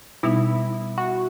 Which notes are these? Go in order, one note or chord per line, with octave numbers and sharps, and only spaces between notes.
B2 G3 B3 D#4 E4
F#4